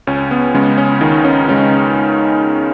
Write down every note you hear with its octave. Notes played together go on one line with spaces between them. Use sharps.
C#2 C#4
B3
C#3 G#3 C#4
C#4
C#2 D#3 D#4
C#4
C#3 G#3 C#4